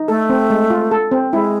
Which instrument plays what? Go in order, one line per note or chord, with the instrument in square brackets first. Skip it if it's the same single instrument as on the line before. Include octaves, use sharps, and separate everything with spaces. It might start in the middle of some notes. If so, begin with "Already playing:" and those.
Already playing: [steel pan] D#4
[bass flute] A3 [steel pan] A4
[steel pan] C4
G#3
F4
A4
C4
[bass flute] G#3 [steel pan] E4